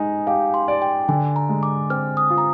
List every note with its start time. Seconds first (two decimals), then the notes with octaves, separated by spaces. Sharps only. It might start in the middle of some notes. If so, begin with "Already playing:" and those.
Already playing: G#3 D#4 D#5
0.27 G4 F5
0.54 C6
0.68 D5
0.82 G5
1.08 D3 G#5
1.36 A#5
1.49 G#3
1.63 D6
1.90 C4 F6
2.17 D#6
2.30 F4
2.38 A#5